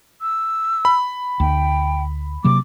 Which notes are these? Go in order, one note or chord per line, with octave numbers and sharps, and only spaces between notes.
E6
B5
D2 G5
C3 F#3 A#3 D6